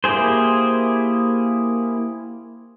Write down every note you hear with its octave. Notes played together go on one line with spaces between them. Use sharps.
A#3 E4 G4 G#4 C5